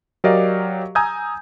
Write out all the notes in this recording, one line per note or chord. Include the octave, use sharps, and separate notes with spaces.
F#3 G4 A#4 D5 D#5 F5
G#5 A#5 D#6 E6 G6 G#6